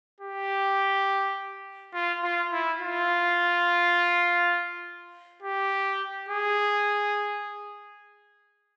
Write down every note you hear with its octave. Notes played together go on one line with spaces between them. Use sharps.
G4
F4
F4
E4
F4
G4
G#4